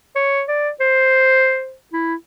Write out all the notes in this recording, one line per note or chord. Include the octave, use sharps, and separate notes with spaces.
C#5
D5
C5
E4